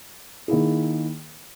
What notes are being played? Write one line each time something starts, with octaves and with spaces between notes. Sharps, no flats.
D#3 A#3 E4 G#4